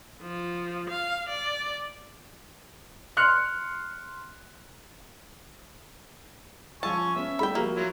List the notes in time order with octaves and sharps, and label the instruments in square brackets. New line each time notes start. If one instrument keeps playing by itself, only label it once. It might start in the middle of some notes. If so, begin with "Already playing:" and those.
[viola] F3
F5
D5
[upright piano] C6 F6 F#6 C#7
[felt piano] F3 F4 E6 [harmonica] G#5 C#6 [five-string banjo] A5
[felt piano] B3 C#4 [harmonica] E5
[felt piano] G3 A3 E4 [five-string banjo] G5 B5
[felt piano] F3 F#4 G4 [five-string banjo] A#3
[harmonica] F#3 E4 F4